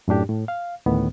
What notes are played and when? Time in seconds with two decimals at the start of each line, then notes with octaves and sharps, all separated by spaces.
0.08 F#2 A2 D4 G4
0.29 A2
0.48 F5
0.86 D2 A2 D#3 B3